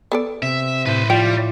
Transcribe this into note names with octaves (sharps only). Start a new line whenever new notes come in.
B3 A4 D5
C3 E5
A2 B4 C5
F3 G3 F4 D5 G5